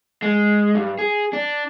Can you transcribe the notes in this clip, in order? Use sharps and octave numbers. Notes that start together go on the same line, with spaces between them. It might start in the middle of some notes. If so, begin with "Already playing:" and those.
G#3
G2
G#4
D4